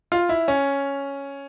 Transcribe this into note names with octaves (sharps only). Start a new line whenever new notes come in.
F4
E4
C#4